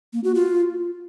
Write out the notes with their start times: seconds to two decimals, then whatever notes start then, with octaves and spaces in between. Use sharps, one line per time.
0.13 A#3
0.24 F#4
0.35 F4